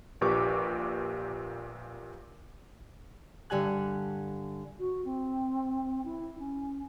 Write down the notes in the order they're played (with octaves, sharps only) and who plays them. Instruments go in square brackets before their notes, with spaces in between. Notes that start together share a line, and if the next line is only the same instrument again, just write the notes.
[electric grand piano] A#1 A#2 G4 B4 C#6 D6
[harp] G2 D3 G4 G#5 F#6
[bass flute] F#4
C4
E4
C#4